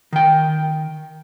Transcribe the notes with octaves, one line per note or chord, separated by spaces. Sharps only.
D#3 G5